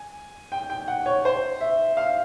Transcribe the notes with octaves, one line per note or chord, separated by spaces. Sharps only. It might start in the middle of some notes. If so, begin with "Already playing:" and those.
Already playing: G#5
G5
G5
F#5
C#5
C5
E5
F5